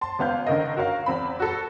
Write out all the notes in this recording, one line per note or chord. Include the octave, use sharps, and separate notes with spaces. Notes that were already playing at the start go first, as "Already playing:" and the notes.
A5 C6
G#1 B3 F5 G6
D3 D#3 A#4 D#5
F#4 A#4 C#5 F5
E2 C4 B5
F#4 A4